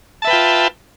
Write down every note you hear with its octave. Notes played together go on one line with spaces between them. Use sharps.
F4 B4 E5 G5 A5